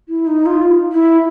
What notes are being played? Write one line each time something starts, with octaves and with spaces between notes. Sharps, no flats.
E4
D#4
F4
E4